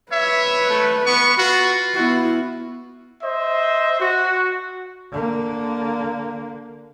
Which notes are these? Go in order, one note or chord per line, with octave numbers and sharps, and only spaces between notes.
B4 C#5 E5
A3
B3 C#6
F4 F#4
B3 E4 F#4
C5 D#5 E5
F#4
D3 A#3